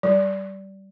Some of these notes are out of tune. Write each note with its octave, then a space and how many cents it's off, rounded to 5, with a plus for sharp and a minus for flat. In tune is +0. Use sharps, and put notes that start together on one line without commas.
G3 -20